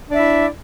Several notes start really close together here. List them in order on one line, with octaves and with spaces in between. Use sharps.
D4 D5 E5 E4